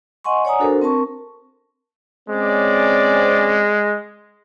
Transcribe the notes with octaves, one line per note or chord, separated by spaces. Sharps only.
D#5 F#5 G#5 C6 C#6
C#5 D5 F#5 G#5 A#5 D#6
D4 F#4 A4 A#4 C5
C4 A#4 A5 C#6
G#3 C4 C#4 D5